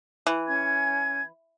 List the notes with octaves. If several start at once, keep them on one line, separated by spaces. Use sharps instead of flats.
E3
C#4 G#5 G#6